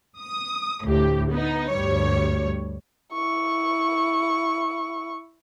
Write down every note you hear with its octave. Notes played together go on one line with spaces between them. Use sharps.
D#6
D2 A2 G4
B3 D#4
D2 G2 G3 C#5
E4 C#6